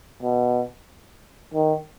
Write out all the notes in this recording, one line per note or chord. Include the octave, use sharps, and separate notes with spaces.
B2
D#3